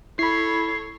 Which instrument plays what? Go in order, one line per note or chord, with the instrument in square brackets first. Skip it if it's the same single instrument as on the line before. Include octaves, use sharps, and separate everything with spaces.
[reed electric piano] E4 [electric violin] A4 C#5 [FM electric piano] B5 C7